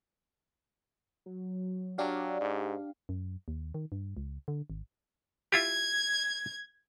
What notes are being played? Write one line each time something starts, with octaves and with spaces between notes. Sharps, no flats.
F#3
F#3 D4 G4 D5 F5
G#2
F#2
D#2
D#3
G2
C#2
D3
G#1
E4 F4 G4 G#6